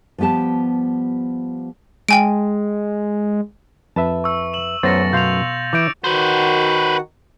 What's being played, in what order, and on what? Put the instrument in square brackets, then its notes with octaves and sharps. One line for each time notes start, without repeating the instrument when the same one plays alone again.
[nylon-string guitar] F3 G3 B3 G4 A5
[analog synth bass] G#3 [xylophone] G5 G#5 D7
[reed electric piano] F2 B4 E5 [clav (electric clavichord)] A5
[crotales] C#6 E6
E7 F#7
[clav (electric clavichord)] F#2 A3 B3 [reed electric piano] C5 C#5 [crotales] A6 A#6 C#7
[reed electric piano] B2 F5 C6 [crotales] G6 F7
[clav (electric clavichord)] E3 E5 [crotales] D6 G6 D7
[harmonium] D#3 F#4 F#5 [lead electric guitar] B4 C5